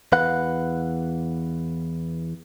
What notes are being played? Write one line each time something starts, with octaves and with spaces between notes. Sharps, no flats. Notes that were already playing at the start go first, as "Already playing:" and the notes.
E2 B4 F5 F#5